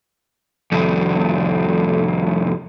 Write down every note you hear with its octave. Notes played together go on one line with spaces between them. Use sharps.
C2 F2